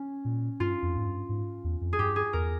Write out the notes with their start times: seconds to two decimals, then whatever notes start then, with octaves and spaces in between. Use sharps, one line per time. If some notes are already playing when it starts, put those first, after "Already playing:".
Already playing: C#4
0.25 A#2
0.60 G2 F4
0.82 F2
0.97 G#2
1.06 G2
1.29 G#2
1.64 E2
1.81 F2
1.93 G#4
1.98 G2 G4
2.16 G#4
2.33 E2 A#4